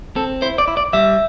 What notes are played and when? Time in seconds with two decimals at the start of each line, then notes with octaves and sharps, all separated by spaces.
0.16 C4 A4
0.42 E4 C5
0.58 D5
0.68 E4
0.77 D5
0.93 G3 E5